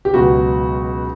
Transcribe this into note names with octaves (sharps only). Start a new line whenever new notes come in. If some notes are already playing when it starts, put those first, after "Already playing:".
G4
C#2 B2 F#3 F#4